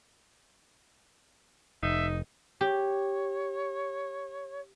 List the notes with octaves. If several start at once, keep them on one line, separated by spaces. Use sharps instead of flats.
F1 D#4 E5
G4 C#5